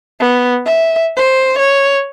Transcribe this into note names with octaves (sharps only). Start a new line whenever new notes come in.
B3
E5
C5
C#5